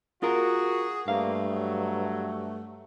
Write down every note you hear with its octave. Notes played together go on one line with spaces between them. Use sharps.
F4 F#4 G#4 A#4
G2 A3 A#3 F5
F#3